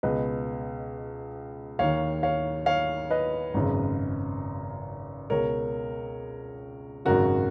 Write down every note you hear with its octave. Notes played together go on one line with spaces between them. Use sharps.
C#2 B2 B4 D#5
D#2 D#3 C#5 F5
C#5 F5
C#5 F5
B4 D#5
G#1 F#2 C#3
C#2 B2 A#4 C#5
G#1 F#2 C#3 F#4 A#4